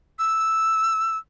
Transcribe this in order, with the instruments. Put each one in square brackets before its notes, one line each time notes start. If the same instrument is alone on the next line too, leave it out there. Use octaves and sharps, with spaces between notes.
[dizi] E6